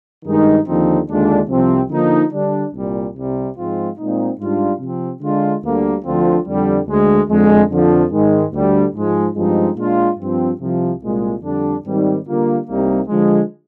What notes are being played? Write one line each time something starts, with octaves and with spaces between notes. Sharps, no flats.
G2 D#3 G#3 D#4
D#2 D3 F3 C4 D#4
D#2 D3 G#3 D4 F4
C2 C3 F3 C4
D3 F3 A#3 D#4
D3 G3 D4
C2 A#2 G3
C2 C3 G3
G#2 F3 G#3 C4 F4
A#2 G#3 C4 D#4
G#2 G3 D4 F4
C3 F3 C4
D3 G#3 D4 F4
D2 D3 G3 A#3
D2 D3 F3 C4 F4
F2 D3 G3
D2 D3 G#3
F2 D3 G#3
F2 D3 F3
G#2 D#3 G#3
D2 D3 G3 D4
G#2 F3 G#3
G2 F3 G#3 C4 D#4
A#2 G#3 D4 F4
G2 F3 C4
C2 C3 F3
C2 A#2 G#3
F2 D3 G3 D4
G#2 D#3 G3 C4 D#4
D3 G3 A#3 F4
C2 C3 G3 A#3 D#4
D3 F3 G#3